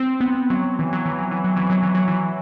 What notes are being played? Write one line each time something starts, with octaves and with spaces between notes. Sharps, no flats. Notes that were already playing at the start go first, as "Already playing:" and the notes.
Already playing: C4
B3
F#3
E3
F#3
E3
F#3
E3
F#3
E3
F#3
E3
F#3
E3